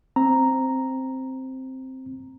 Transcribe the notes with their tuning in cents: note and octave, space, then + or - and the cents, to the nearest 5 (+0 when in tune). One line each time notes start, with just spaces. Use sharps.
C4 +0 A#5 +0